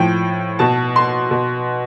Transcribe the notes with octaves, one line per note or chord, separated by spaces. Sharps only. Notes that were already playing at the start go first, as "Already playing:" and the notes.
Already playing: A2 F3 G5
B2 A5
C6
B2